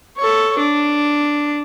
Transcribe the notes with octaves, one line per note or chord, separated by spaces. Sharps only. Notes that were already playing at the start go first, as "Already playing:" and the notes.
A4 C#5
D4